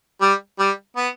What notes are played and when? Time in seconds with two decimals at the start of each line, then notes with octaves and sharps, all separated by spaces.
0.21 G3
0.59 G3
0.96 B3